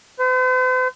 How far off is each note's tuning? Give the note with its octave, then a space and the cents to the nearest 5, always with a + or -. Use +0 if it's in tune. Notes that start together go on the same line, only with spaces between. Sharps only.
C5 -45